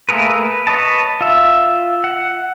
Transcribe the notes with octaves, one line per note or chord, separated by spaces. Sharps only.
A3 A#3 G#4 A#4 B4
B4
B4 C#5 D#5 A5
F4 E5
F#5